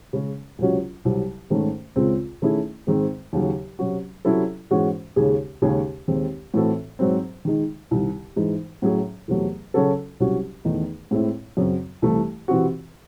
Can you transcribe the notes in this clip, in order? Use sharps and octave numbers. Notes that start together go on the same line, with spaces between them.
C#3 G#3 C#4
C#2 C3 F#3 C#4 F#4
C2 C3 F#3
G#2 D#3 A3 C#4
C#2 C#3 G#3 C4
D#3 A3 C#4 E4 G#4
G#2 D#3 G#3 C4
D#2 C#3 F#3
C3 F#3 C#4 F#4
C3 F#3 C#4 E4 A4
G#2 E3 G#3 C#4 F#4
D#2 C#3 G#3 C#4 G#4
D#2 C#3 G#3 C#4 G#4
D#2 D#3 G#3 C4
A2 E3 C4 F#4 A4
G#2 F#3 C4
D#3 G#3 D#4
C2 C3 D#3
G#2 E3 G#3 D#4 G#4
A2 F#3 C#4 G#4
E2 C3 F#3 A3
C#3 F#3 C#4 F#4 A4
C2 C3 F#3 C#4 F#4
E2 D#3 A3 D#4
A2 G#3 C4 E4
F#2 C#3 F#3 C4
C2 C3 E3 A3
C3 E3 C4 F#4